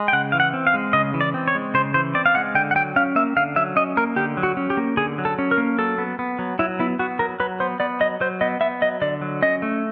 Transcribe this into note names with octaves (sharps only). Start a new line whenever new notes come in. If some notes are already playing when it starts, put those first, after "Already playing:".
Already playing: G#3
G5
C#3 F#5
E3 F5
F#5
C4
F5
G#3
C#3 D#5
E3
D5
C4
C#5
G#3
C#3 C5
E3 C5
C4 D5
F5
G#3 F#5
D3 G5
F#5
F#3 G5
C#4 F5
A#3 E5
D3 F5
F#3 E5
C#4 D#5
A#3 A#4
D3 G4
F#3
F#4
C#4
G4
A#3
D3 G#4
F#3
A4
C#4
A#4
A#3
F#3 A4
B3
B3
F#3
F#3 E4
B3 E4
B3 F#4
F#3 A#4
F#3 B4
B3 C5
B3 D5
F#3 D#5
F#3 C5
B3 D#5
B3 E5
F#3 D#5
D3 D5
F#3
C#4 D#5
A3